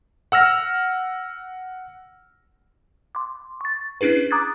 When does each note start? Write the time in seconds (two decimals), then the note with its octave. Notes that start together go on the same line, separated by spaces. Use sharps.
0.32 F#5 E6 F6 A#6
3.15 C6 D6
3.61 C#6 A6
4.01 C#4 D4 E4 G#4 B4
4.31 A#5 D6 D#6 F#6 G#6 A6